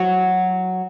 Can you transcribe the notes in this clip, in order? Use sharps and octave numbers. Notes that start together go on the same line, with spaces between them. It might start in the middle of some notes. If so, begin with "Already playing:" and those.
Already playing: F#3 F#4